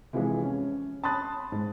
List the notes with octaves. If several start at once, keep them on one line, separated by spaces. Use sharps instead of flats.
C3 E3 F3 G#3
C#4
A5 B5 C6 D#6 F#6 A6
G#2